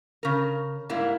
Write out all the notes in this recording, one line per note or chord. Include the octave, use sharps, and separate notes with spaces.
C#3 A#4
G#2 G3 A#3 E4